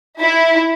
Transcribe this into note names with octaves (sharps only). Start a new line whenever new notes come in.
E4